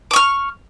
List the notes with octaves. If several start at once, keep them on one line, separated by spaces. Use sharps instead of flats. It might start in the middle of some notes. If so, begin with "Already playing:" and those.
C#6 D6 F6